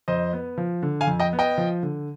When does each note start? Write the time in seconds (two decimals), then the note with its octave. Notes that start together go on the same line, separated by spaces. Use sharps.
0.08 F2 C5 D#5
0.33 B3
0.58 F3
0.83 D3
1.01 F5 G#5
1.07 F2
1.20 D#5 G5
1.33 B3
1.39 D#5 G5
1.58 F3
1.83 D3